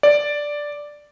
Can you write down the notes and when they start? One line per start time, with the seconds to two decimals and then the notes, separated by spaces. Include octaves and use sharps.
0.03 D5